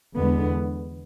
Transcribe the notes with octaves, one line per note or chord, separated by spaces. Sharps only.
E2 D3 G#3 B3